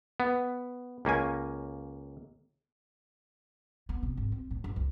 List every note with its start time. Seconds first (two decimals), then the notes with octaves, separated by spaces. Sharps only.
0.20 B3
1.05 C#2 A#3 C#4 G#5
3.89 B3
4.03 C3
4.17 G#1
4.32 C4
4.51 A2
4.64 F#1
4.76 C#2